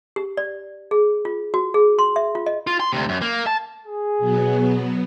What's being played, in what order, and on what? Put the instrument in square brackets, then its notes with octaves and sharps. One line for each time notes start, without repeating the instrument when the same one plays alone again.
[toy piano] G4
D5
G#4
F4
F#4
G#4
C6
E5
F4
D#5
[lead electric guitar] F4
C6
D2 C3
F#2
A#3
A5
[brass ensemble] G#4
[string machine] B2 F#3 B3